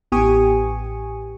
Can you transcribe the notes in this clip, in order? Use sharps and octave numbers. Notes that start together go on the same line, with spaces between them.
A1 B3 G4 G#5 C#6 D#6